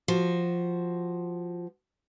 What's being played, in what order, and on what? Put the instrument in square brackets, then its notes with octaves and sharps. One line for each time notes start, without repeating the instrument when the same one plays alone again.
[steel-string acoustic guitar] F3 F#4